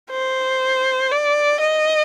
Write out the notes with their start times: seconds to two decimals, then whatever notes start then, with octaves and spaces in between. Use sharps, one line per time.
0.10 C5
1.11 D5
1.60 D#5